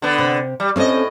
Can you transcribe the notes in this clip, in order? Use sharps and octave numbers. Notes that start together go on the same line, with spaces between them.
D3 B3
C3
G3
A2 C4 C#4 A4 D#5